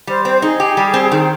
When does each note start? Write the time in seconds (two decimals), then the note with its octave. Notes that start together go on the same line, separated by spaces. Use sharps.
0.07 G3 C5
0.25 C4 C5
0.42 D#4 G#4
0.60 G4
0.77 G3
0.94 C4
1.11 D#3